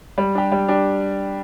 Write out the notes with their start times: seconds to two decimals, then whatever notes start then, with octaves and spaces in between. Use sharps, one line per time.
0.18 G3
0.35 D4 G4
0.52 G3
0.69 D4 G4